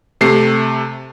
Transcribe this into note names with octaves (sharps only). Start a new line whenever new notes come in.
C3 A3 C7